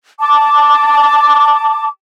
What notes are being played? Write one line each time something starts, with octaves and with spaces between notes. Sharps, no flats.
A5 D6